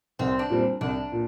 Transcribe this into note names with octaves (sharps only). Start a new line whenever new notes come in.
C2 C4
D4
A#2 G3 C4
C2 D4
A#2